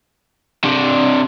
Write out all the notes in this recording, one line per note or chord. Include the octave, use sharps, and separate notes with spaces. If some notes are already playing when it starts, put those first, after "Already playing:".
C3 D4